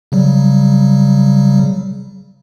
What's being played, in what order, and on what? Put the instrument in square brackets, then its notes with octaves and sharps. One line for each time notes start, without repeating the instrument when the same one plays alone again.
[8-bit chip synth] C#3 F#3 G3